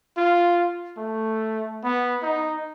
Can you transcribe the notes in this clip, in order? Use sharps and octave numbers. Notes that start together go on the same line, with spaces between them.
F4
A3
B3
D#4